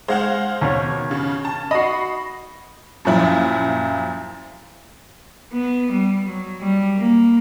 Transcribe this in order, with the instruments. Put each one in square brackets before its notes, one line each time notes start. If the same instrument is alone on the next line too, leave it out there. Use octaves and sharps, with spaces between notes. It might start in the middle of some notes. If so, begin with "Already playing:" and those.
[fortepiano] G#3 [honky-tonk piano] C5 F5 F#5
[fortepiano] D#2 B2 C#5
[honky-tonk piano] C#3
A5
[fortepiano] F#4 D#5 [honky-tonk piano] B5 C7
[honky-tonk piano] F#2 A#2 F3 E4
[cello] B3
G3
F#3
G3
A#3